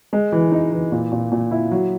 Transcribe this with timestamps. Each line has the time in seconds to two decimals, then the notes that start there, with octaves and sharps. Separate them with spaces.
0.13 G#3
0.32 E3
0.52 D#4
0.72 E3
0.92 A#2
1.12 A#2
1.32 A#2
1.51 E4
1.71 F#3